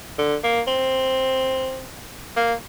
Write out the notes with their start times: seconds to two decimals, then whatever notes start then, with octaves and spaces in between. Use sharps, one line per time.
0.18 D3
0.43 A#3
0.67 C4
2.36 A#3